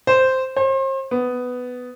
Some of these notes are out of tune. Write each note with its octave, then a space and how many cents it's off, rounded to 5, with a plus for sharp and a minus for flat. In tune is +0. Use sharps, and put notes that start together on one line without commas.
C5 -5
C5 +40
B3 +10